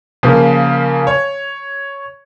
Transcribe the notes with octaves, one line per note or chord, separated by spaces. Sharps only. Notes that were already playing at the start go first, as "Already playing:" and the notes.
C#3 F3 A#3
C#5